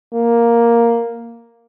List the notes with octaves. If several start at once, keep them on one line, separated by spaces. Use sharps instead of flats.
A#3